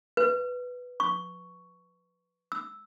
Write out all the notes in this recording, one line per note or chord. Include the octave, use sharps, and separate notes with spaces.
B4
C#6
E6